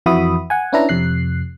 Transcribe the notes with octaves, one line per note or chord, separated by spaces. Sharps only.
F2 E3 F#4 E5 B5 D#6
F#5 G#5
C#4 D4 E4 B4 E5 A#5
F2 C3 F#6 C7